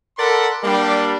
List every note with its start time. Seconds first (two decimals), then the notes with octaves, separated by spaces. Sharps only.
0.18 A4 A#4 D5 F#5 B5 C6
0.64 G3 A#3 D4